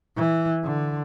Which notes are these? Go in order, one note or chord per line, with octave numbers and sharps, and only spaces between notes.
E3
D3